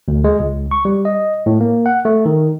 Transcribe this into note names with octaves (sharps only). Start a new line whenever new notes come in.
D2
G#3
C#2
C#6
G3
D#5
A2
A#3
F#5
A3
D#3